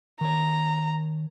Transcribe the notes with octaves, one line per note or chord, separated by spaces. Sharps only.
D#3 C#5 A#5